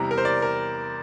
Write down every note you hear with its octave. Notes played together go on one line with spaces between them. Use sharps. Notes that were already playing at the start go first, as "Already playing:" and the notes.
Already playing: E2 C3 G3 A#5
A#4
C5
D5
A#4